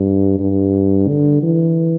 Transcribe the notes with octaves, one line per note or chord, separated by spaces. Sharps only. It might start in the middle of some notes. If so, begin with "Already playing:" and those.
Already playing: G2
G2
D3
E3